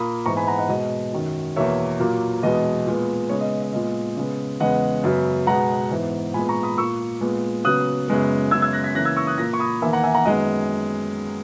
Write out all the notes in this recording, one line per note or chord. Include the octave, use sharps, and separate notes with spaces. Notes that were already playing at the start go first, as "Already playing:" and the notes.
Already playing: A#2 A#3 B5 D#6
G#2 E3 G#3 B3 A#5 C#6
G#5 B5
F#5 A#5
D#5 F#5
B2 G#3 B3 D#5
F#2 D#3 F#3
E2 B2 A#3 C#5 E5
A#2 F#3 A#3
E2 B2 G#3 B3 D#5
A#2 G#3 B3
C#3 G#3 B3 C#5
D#5
D#5
A#2 G#3 B3 D#5
C#3 G#3 B3
E2 C#3 G#3 B3 D#5 F#5
F#2 C#3 F#3 B3
B2 G#3 B3 F#5 A#5
G#2 E3 B3
A#2 G#3 B3 G#5 B5
A#5 C#6
B5 D#6
A#2 A#3 C#6 E6
A#2 G#3 B3
C#3 F#3 B3 D#6 F#6
F#2 C#3 G#3 B3
F#2 C#3 G#3 B3 E6 G#6
E6 G#6
F#6 A#6
G#6 B6
C#3 E3 A#3 F#6 A#6
E6 G#6
C#6 E6
D#6 F#6
A#2 A#3 F#6 A#6
C#6
B5 D#6
E2 D#3 A#3 E5 G#5
F#5 A#5
E5 G#5
F#5 A#5
F#2 D#3 G#3 B3 D#5 F#5